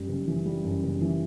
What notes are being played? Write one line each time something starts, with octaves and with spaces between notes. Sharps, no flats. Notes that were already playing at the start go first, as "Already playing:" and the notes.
Already playing: F#2 G3
F#1
E3
G3
F#2
F#1
E3